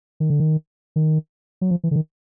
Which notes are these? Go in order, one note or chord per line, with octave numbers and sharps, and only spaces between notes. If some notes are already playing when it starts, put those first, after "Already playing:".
D#3
D3
D#3
D#3
F#3
F3
E3
D3
D#3